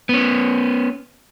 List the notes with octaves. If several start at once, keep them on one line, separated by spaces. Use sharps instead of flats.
B3 C#4